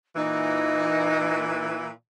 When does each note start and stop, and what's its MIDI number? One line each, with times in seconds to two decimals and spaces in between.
0.16 1.90 46
0.16 1.90 52
0.16 1.76 63